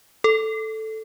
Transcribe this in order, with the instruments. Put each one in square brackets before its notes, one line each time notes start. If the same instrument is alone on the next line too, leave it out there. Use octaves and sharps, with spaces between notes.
[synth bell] A4